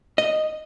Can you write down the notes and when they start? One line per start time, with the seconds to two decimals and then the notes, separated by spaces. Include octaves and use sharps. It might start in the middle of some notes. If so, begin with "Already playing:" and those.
0.18 D#5